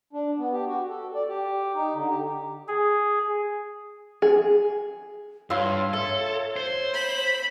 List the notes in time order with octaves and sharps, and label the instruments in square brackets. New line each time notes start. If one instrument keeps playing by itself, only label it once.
[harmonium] D4
B3
G4
F#4
A4
D5
G4
D#4
D3
G4
[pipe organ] G#4
[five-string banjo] G#4
[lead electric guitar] G2 [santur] F4 C6 E6 [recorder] C#5
[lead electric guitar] A4 [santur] E5
[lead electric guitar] C5
[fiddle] B5